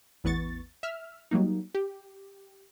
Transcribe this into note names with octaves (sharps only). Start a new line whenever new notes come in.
A1 E2 B3 C#6 A6
E5 F6
F#3 G3 A#3 D#4
G4